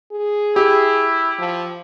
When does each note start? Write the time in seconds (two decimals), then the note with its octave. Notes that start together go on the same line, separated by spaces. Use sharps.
0.12 G#4
0.56 E4 G4
1.38 F3